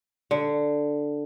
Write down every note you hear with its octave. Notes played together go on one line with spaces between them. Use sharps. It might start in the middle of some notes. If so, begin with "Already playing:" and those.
D3